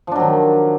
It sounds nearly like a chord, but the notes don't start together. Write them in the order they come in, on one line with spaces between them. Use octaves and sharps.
F3 D4 F#3 D#3